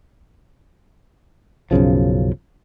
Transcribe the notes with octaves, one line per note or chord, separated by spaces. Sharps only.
B1 F#2 C#3 F3